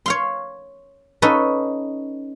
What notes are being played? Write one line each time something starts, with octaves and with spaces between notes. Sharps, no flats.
C#5 F5 C6
C#4 D#4 A4 B4